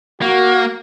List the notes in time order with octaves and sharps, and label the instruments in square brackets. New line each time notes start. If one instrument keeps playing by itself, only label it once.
[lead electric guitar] A#3 [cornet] F#4